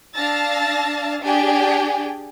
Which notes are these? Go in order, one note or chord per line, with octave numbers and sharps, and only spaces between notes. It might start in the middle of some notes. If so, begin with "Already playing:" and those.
D4 F5 A5 E6 A6 A#6
D4 G4 G#4 G5 G#5